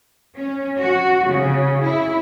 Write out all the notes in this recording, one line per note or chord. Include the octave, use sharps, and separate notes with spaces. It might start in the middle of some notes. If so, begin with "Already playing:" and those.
C#4
F#4
C#3
E4